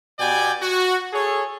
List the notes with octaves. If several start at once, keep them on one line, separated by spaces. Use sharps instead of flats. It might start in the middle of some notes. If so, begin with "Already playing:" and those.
B2 B3 G4 D5 G5 G#5
F#4
G#4 A4 C#5